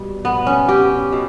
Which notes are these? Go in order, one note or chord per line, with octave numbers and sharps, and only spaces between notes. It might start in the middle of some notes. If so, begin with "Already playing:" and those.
Already playing: B2 G3
B3
C#4
G4
B2